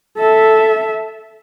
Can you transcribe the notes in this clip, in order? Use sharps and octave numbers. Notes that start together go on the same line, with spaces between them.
A4 E5